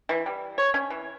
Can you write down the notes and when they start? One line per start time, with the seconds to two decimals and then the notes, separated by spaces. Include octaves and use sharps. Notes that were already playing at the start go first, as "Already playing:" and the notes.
0.09 E3
0.26 G3
0.58 C#5
0.74 C#4
0.90 E3